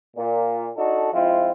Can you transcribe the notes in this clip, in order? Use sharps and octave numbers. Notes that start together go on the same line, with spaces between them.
A#2
D4 D#4 F#4 A4
F3 G#3 C4 E4 F4